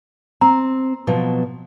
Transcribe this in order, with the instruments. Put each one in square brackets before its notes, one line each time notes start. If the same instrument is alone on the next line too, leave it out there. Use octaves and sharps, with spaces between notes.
[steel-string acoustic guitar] C4 [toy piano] A#5
[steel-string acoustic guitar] B2 F3 F#3